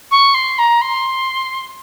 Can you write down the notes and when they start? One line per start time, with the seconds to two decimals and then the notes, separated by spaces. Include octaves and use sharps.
0.11 C#6
0.34 C6
0.58 A#5
0.81 C6